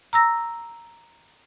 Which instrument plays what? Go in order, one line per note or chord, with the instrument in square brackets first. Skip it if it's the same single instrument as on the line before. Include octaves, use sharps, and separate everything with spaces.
[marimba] A#5 E6 A#6